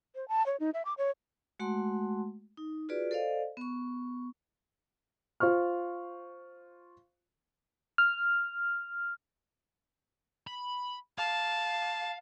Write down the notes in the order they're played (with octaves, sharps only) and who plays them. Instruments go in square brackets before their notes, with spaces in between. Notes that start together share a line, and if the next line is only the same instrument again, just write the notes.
[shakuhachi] C5
A5
C#5
D#4
E5
D6
C#5
[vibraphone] G#3 A3 F#4 F#5 A5 C6
D#4
F4 F#4 G#4 B4 D5
A4 C5 D5 D#5 F5
B3 C#6
[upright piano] F4 C5 C#6 F6
[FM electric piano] F6
[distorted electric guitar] B5
[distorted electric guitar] F5 [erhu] A5